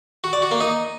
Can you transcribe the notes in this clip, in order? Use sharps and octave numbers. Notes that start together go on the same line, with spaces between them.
F#4
D5
F#4
A#3
D#4